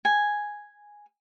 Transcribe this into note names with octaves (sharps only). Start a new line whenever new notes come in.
G#5